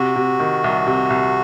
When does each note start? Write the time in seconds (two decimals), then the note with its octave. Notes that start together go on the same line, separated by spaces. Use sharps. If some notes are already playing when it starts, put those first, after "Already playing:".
Already playing: C3 F#4
0.16 C3
0.40 D#3
0.64 C2
0.87 C3
1.10 C2